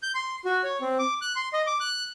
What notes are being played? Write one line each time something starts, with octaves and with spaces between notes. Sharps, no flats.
G6
C6
F#4
C#5
C4
D6
F#6
C6
D#5
D6
F#6